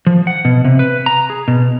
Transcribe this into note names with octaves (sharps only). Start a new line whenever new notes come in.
F3
F#5
B2
C3
B4
A#5
G#4
B2